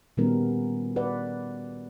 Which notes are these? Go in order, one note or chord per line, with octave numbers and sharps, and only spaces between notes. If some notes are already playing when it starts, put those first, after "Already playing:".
A#2 D#3 G3 B3 C#4 A#4
B4 D5 F#5